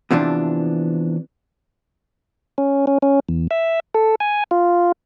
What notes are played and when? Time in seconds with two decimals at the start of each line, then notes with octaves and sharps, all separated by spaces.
0.11 E2 C3 E3 F3 D4
2.58 C#4
2.87 C#4
3.02 C#4
3.29 E2
3.51 E5
3.94 A4
4.20 G#5
4.51 F4